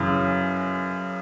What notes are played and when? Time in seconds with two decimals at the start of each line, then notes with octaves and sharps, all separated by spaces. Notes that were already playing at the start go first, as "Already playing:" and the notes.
Already playing: F#2 C#3 E3